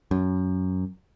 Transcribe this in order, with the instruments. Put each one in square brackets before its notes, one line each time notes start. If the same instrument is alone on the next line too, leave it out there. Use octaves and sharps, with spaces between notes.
[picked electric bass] F#2